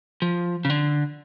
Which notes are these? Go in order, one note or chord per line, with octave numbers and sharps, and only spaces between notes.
F3
C#3
D3